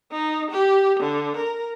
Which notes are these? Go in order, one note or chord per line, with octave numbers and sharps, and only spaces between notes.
D#4
G4
D3
A#4